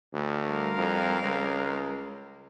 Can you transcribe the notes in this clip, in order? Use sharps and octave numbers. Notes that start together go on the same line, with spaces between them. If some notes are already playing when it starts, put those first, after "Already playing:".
D2
G3 A#4 F5
F2
C#2